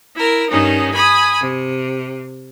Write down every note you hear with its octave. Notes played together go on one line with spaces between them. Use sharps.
E4 A#4
G2 D#3 C#4 D#4
G#5 B5 D#6
C3